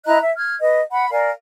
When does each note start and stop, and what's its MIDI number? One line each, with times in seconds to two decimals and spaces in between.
0.06 0.17 64
0.06 0.17 75
0.06 0.17 82
0.06 0.17 90
0.21 0.33 76
0.36 0.55 89
0.36 0.55 92
0.62 0.80 71
0.62 0.80 75
0.91 1.09 78
0.91 1.09 83
1.10 1.30 70
1.10 1.30 74
1.10 1.30 77
1.10 1.30 80